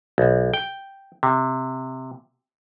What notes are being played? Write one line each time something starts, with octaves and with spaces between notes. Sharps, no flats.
B1
G5
C3